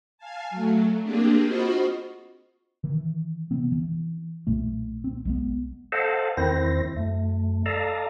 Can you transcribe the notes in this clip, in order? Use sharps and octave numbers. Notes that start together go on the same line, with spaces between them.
F5 G#5 A5
F#3 A3
A#3 C4 D4 G4 G#4
F4 F#4 C5 D#5 B5 C#6
D#3 E3
C3 E3 B3 C4
E3
B1 A#2 A3
C4
B1 G#3 B3
A4 C5 D#5 F5 F#5 A5
E2 D#3 C4 E4 C5 A#6
F#2 A3
A4 D5 D#5 F5 A5 A#5